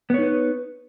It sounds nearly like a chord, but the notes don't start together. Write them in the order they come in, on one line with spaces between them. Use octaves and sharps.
B3 C#5 D#4 B4